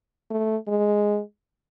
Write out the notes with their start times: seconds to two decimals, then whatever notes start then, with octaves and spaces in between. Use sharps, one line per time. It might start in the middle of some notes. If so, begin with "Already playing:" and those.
0.30 A3
0.68 G#3